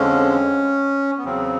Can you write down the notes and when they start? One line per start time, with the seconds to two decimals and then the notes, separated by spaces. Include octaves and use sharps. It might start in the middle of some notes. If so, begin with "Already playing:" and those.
Already playing: F2 D3 F3 G#3 C#4
1.18 B3
1.24 E2 C#3 F#3 C4